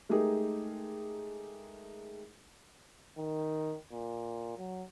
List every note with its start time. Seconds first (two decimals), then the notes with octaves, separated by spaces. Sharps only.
0.09 G#3 A3 D#4 G4 G#4 A#4
3.18 D#3
3.93 A#2
4.58 F#3